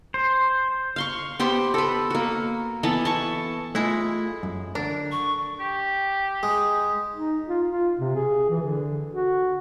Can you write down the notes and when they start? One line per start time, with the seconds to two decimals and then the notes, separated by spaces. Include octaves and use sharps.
0.14 C5
0.96 F5 C6 C#6
1.39 B3 G4 C5 C6
1.74 A4 B4
2.10 A#3 F#4
2.83 E3 B3 A4 A5
3.05 A5 C#6
3.75 G#3 A3 E4 F4
4.43 F#2
4.75 D3 D4 A#4
5.12 C#6
5.60 G4
6.43 G#3
7.13 D#4
7.48 F4
7.68 F4
8.00 C3
8.15 G#4
8.49 E3
8.62 D3
9.13 F#4